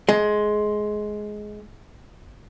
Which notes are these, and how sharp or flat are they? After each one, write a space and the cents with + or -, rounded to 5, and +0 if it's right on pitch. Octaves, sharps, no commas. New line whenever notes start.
G#3 +15